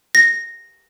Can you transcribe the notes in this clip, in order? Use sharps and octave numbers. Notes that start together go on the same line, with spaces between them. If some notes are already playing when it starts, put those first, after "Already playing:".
A#6